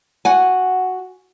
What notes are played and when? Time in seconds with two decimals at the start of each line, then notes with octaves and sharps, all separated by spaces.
0.25 F#4 F#5 G#5